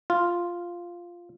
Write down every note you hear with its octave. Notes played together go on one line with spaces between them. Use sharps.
F4